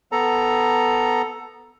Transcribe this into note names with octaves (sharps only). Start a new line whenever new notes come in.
B3 A4 A#5